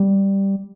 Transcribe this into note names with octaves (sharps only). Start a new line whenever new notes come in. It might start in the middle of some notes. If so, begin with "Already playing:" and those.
Already playing: G3